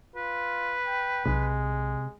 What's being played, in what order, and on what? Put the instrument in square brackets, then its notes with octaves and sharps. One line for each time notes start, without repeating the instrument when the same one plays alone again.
[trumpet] F4 [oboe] B4
[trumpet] G5
[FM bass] B1 [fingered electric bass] C3 [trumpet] G#3